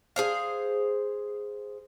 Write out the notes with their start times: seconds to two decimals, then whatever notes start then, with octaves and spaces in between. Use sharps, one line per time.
0.16 G#4 C5 F5